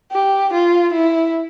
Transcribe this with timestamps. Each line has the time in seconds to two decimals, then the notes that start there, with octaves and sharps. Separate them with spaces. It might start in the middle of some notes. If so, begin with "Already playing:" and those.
0.12 G4
0.53 F4
0.93 E4